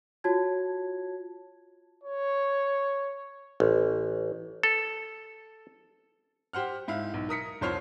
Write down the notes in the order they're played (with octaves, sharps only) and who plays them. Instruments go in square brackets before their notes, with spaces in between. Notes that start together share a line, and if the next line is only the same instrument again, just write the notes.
[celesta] F4 F#4 C#5 A5 G#6
[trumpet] C#5
[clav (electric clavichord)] A1
A4
[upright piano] G4 C5 F#5 F6
G#2 E4 F5
B1
A#4 D#6 B6 C#7
C2 F2 C5 C#5 F6 C7